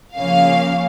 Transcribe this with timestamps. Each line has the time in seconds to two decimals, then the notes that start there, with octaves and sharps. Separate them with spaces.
0.17 C#3 F3 A#3 C#4 F5